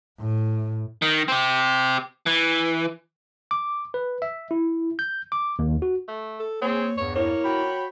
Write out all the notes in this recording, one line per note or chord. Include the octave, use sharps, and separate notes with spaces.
A2
D#3
C4 G4
E3
D6
B4
E5
E4
G6
D6
D#2
F#4
A3
A4
A#3 C4 G#4 C#5
E2 G2 C#5
A#3 E4 C#5
F#4 G5 B5